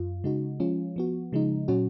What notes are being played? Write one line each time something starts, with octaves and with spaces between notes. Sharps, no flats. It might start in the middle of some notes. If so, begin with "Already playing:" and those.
Already playing: F#2 F4
C#3 G#3 D#4 F#4
F3 G#3 C#4 F4
F3 B3 F#4
C#3 F3 G#3 D#4
A#2 F#3 C#4 F#4